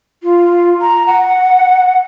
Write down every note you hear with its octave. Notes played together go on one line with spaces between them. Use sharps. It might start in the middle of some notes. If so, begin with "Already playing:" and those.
F4
A#5
F#5